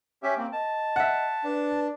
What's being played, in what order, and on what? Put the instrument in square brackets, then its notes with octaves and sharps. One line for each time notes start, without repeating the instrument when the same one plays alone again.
[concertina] C#4 G4 E5
A#3 C4
[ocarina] D#5 [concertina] A5
[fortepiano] E5 F#5
[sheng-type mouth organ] D4 [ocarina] B4